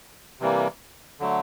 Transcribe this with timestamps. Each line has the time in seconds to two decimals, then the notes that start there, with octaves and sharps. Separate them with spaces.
0.40 C3 E3 G3 A#3
1.20 D3 F#3 A3